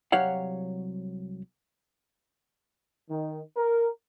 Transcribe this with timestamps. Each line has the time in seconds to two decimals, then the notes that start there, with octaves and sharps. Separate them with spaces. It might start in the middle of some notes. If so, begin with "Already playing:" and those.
0.12 C2 F#3 G4 C#5 F5 F#5
3.10 D#3
3.57 A#4